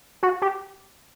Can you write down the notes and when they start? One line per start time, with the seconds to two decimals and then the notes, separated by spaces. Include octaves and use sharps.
0.23 F#4
0.42 G4